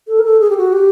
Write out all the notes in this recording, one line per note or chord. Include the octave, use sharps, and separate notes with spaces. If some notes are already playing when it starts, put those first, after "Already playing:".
A4
A#4
A4
G#4
G4
F#4
G4